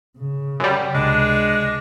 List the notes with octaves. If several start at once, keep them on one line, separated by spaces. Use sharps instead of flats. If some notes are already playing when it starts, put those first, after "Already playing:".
C#3
F#2 G3
C#2 C3 G#3 D4